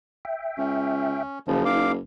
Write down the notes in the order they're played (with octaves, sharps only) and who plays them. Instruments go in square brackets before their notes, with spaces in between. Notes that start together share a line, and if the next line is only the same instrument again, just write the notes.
[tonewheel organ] E5 G5
[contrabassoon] C#2 [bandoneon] C#4
[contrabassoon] F#1 [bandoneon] C#3 F3
[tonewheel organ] D#4 [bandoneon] F5 D6